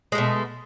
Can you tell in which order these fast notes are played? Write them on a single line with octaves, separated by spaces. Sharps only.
G#3 A3 B2